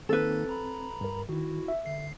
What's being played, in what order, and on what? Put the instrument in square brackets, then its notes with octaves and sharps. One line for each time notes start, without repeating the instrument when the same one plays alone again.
[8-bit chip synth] D#3 A#3 D#4 [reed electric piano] C4 [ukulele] A4 B4
[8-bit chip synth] A#5 B5
[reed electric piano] G2 A#4
[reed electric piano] D#3 [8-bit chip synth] E4 F#4
[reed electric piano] E5
[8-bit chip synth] D3 C7